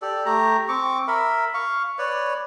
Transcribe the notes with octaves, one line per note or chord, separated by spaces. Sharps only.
G4 A4 D5
A3 G4 A#5
C4 C#6 D6
A#4 E5 B5
F5 C#6
B4 C#5 D5